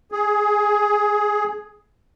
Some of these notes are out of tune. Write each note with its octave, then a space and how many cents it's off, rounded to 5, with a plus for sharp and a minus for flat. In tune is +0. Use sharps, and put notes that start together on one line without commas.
G#4 +5